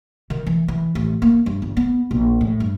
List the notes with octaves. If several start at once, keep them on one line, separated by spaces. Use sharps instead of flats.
D#3
E3
E3
A1
A#3
G2
G1
B3
A#1
A2
G2